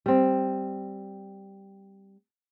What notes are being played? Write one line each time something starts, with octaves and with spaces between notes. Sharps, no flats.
G3 C4